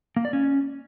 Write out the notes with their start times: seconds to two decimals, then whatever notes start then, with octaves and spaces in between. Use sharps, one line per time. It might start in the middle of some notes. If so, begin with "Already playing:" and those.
0.16 A#3
0.25 D5
0.33 C#4